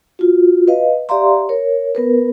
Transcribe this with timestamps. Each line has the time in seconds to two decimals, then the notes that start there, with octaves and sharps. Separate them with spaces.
0.19 F4 F#4
0.68 B4 D#5 F5
1.09 G4 D5 E5 F5 A#5 C6
1.49 A#4 C#5
1.95 B3 A#4 B4